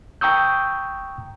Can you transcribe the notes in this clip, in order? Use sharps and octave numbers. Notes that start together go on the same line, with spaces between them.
G5 A#5 C#6 D#6 E6 G6